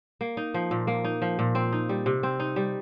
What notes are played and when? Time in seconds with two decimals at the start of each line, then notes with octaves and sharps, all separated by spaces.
0.21 A#3
0.37 D#4
0.54 F3
0.71 A#2
0.87 A#3
1.04 D#4
1.22 F3
1.39 A#2
1.55 C4
1.72 D#4
1.89 G3
2.06 C3
2.23 C4
2.40 D#4
2.56 G3